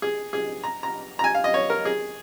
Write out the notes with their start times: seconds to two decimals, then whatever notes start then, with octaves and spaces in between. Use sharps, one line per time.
0.02 G#4
0.33 G#4
0.64 A#5
0.83 A#5
1.19 A#5
1.24 G#5
1.34 F5
1.44 D#5
1.54 C#5
1.70 A#4
1.85 G#4